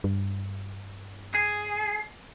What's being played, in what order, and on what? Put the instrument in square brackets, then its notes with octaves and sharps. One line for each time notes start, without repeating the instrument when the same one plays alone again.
[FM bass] G2
[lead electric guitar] G#4